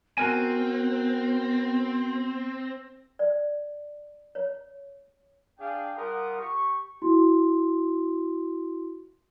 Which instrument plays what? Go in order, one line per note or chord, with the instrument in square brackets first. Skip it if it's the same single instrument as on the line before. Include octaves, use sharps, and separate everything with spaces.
[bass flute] B3 [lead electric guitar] C4 [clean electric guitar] F#4 A#4 G#5
[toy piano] D5
C#5
[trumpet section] D4 G#4 F5 G5
G3 F4 A#4 F#5 D#6
G4 C#6
[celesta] E4 F#4 C6